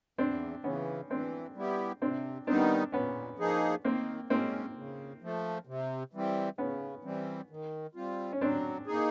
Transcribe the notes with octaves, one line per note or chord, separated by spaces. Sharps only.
E2 C4 D4
C#3 E3 B3 C#4
E3 C4 D4
G3 B3 E4 G4
C3 C4 D4
D#3 G3 B3 C4 D4 D#4
A#2 B3 C#4
F3 A#3 D#4 G#4
D#3 A#3 C4
G#3 A#3 C4 C#4
C#3
F3 A3
C3
E3 G3 C4
C#3 B3 C#4
E3 G3 C4
D#3
G3 C4 F4
C#4
F#3 C4 D4
A#3 D#4 G#4